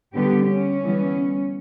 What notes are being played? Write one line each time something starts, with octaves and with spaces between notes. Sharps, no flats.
D3 G3 B3 G4
C#4
E3 G3 B3